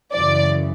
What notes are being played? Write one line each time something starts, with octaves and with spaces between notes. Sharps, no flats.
F#2 C#3 E3 D5